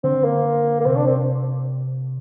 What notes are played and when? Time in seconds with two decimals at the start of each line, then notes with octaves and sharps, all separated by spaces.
0.03 D3 C4
0.24 A#3
0.80 A#3
0.86 C3 C4
0.96 D4
1.06 C4